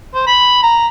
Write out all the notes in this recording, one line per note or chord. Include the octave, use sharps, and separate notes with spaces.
C5
B5
A#5